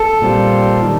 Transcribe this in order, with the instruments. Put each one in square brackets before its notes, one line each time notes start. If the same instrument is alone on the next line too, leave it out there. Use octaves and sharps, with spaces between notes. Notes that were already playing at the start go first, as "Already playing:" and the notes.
Already playing: [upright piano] A4
[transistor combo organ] A#2 G3 C4 F4
D#3 G3